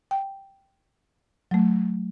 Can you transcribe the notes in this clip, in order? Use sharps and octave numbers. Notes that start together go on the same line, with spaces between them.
G5
F#3 A3